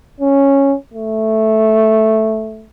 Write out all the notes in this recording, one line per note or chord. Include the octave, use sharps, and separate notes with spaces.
C#4
A3